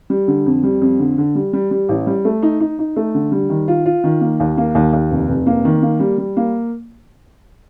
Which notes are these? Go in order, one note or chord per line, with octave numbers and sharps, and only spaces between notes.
G3
D3
F2
G3
F2
D3
D3
G3
G3
G3
A1
G3
A3
D#4
D#4
D#4
A3
D3
G3
D#3
F4
F4
D#3
A#3
D#2
A#3
D#2
D#2
F1
F1
A#3
D#3
A#3
G3
G3
A#3